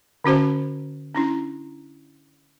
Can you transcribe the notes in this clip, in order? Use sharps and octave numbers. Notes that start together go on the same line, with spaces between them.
D3 C#4 F#4 C5 A5
C#4 D4 E4